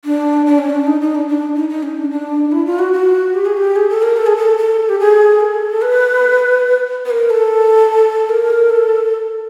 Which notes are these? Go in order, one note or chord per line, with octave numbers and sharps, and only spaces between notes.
D4
D4
C#4
D4
D#4
D#4
D4
D4
D#4
D#4
C#4
D4
D4
E4
F4
F#4
F#4
G4
G#4
G4
G#4
A4
A#4
A4
G#4
A4
A4
G4
G#4
A#4
A4
B4
B4
A#4
A#4
A4
A#4
A4